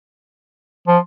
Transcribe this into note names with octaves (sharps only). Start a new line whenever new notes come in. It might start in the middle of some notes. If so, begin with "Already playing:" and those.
F3